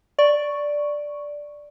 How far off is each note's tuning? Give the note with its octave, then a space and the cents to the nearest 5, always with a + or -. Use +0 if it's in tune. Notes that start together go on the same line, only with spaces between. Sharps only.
D5 +0 C#6 +0